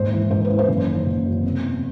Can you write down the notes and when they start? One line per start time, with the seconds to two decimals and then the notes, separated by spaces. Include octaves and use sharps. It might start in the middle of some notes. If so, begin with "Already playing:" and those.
Already playing: D#2 G#2 C5
0.13 E3
0.30 G#2 C5
0.45 B4
0.50 E3
0.59 C5
0.68 F#1
0.87 D#3
1.06 F#1
1.25 F#2
1.43 C3
1.62 E2